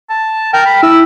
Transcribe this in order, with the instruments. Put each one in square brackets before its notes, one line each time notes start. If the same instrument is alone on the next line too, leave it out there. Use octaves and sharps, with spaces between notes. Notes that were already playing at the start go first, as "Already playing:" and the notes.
[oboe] A5
[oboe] A#4 [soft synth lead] G5
[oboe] B5
[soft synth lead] E4 [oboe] E6